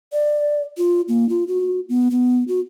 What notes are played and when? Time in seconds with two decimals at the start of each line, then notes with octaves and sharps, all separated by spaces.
0.13 D5
0.78 F4
1.08 A#3
1.29 F4
1.47 F#4
1.89 B3
2.11 B3
2.48 F#4